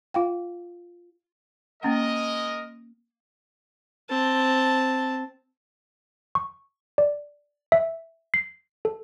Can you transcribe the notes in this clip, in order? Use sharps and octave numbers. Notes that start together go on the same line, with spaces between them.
F4 F5 G5
G#3 A#3 C#4 A#4 D#5 F#5
C4 A5
C#6
D5
E5
C7
A4